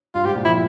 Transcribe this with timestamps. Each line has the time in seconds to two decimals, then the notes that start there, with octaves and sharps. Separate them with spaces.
0.15 G2 F4
0.25 G#2 G4
0.35 A#2
0.45 F3 E4